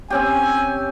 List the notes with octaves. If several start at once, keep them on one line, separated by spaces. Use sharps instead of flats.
C4 C#4 G4 G#5